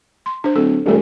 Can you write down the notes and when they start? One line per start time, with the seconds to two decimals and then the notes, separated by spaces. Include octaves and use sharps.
0.26 C6
0.44 D4 C5
0.56 D1 A4
0.86 E1 G3 A3 A4